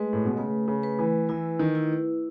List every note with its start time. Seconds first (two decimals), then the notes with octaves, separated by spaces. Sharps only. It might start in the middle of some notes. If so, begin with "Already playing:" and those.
Already playing: G#3 A3 B4
0.13 A2
0.25 B2
0.37 C#3 A3
0.68 C#3
0.83 B4
0.99 E3
1.29 E3 E4
1.59 D#3
1.75 E4